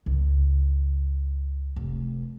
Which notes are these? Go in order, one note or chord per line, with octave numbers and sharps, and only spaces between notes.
C#2
F1